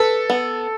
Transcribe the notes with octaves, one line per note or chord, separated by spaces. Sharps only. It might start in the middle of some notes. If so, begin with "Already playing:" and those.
Already playing: A4 B4
B3